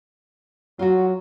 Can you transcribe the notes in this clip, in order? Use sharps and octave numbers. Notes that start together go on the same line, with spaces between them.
F#3 F4 F#4